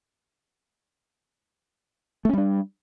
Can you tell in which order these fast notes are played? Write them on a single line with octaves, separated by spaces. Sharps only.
A3 C#4 G3 D4